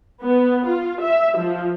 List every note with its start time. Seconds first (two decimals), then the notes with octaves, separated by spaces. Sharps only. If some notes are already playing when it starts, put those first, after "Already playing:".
0.22 B3
0.67 F4
1.02 E5
1.38 F3